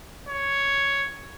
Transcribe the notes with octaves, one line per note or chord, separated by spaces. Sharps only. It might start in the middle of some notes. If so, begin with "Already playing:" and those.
C#5